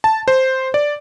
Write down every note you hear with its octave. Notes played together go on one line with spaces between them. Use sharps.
A5
C5
D5